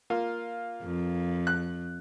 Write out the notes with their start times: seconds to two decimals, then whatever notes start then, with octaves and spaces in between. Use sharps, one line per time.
0.10 A#3 F4
0.83 F2
1.47 F#6